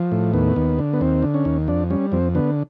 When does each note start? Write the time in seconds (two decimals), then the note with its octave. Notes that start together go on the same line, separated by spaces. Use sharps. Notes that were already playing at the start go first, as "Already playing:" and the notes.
Already playing: F3
0.12 A2
0.33 D#2 B3
0.56 D#2
0.79 D3
0.93 B3
1.01 D#2 C4
1.23 D3
1.34 C#4
1.45 D#2
1.68 F2 D4
1.90 G3 C#4
2.12 F2 C4
2.35 D3 B3